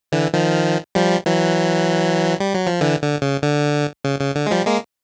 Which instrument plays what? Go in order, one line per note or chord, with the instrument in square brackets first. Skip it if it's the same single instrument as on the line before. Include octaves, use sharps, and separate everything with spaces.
[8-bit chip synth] D3 E3
D#3 F3
F3 G3
E3 F#3
G3
F#3
F3
D3 E3
D3
C#3
D3
C#3
C#3
D3
G#3
F3 G3
G#3 A#3